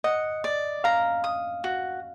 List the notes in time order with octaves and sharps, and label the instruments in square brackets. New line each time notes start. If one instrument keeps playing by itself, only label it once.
[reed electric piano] D#5 [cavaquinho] F#5
[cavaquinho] D5
[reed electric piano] F5 [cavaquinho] A#5
[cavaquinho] D#6
F#4